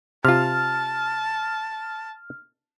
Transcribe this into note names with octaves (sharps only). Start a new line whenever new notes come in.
C3 F4 A5 F6